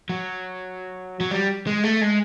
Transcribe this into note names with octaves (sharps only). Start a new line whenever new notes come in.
F#3
F#3
G3
G#3
A3
G#3